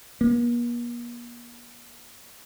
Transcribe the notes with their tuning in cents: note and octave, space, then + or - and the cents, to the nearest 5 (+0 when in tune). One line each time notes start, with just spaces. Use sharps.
A#3 +45